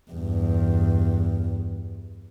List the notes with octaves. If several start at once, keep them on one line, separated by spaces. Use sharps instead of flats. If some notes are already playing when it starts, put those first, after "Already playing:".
E2 G2